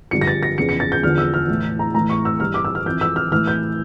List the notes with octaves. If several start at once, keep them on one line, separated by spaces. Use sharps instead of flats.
G2 D3 F3 C#7
A#6
A6
A#6
E2 C#3 F3 C#7
C#7
A6
G6
E2 D3 F3 F6
E6
F6
A2 E3
A#5
A2 E3 A#5
C#6
E6
G2 E3 F6
D6
E6
F6
F2 E3 G6
E6
F6
A2 E3 F6
G6